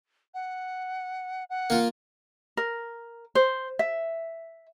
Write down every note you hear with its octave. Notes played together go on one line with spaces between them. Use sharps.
F#5
F#5
A#3 F4
A#4
C5
E5